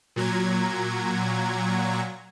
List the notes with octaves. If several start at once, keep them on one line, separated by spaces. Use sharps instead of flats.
A#2 F#3 A#5 G#6